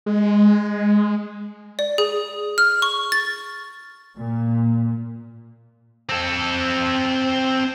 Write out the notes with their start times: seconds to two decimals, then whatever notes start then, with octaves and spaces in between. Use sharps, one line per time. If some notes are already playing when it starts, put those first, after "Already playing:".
0.06 G#3
1.79 D5
1.98 G#4
2.58 F6
2.82 C#6
3.12 A6
4.17 A#2
6.09 C4 A4